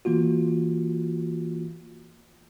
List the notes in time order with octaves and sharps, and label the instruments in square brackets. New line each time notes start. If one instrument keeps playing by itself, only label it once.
[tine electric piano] E3 A#3 F4 F#4